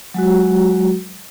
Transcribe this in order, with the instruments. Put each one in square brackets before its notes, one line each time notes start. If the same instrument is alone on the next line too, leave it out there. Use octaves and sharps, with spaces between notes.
[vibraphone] F#3 G#3 F#4